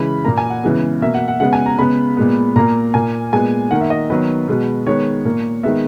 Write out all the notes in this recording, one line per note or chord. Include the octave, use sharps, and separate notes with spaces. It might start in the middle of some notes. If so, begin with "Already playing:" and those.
Already playing: C#3 E3 G#3 B5
A#2 A#3 A#5
G#5
F#5
C#3 E3 G#3 B3
B2 A#3 E5
F#5
F#5
C#3 G#3 B3 F#5
G#5
A#5
C#3 G#3 B3 B5
A#2 G#3 B3
A#2 A#3 A#5
A#2 A#3 G#5
A#2 G#3 B3 G#5
D#3 A#3 F#5
E5
D#5
D#3 F#3 B3 B4
B2 G#3 B3
D#3 G#3 B3 C#5
A#2 A#3
D#3 G#3 B3 E5